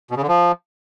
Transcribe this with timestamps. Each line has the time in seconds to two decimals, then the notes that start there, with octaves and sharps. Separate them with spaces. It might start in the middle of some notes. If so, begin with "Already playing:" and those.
0.11 B2
0.17 C#3
0.22 D3
0.28 F3